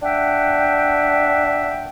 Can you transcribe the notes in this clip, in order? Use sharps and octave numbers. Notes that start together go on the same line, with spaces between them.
D4 E5 F#5 G5